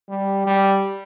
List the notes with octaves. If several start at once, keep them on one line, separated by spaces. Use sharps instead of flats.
G3
G3